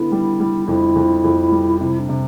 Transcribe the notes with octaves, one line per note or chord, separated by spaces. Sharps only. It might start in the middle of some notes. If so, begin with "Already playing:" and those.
Already playing: D3 B3 E4
G3
G3
F2 E4
F2
F2
G3
C3 E4
D4
C3